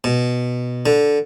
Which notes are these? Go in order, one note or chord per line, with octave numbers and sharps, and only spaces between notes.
B2
D3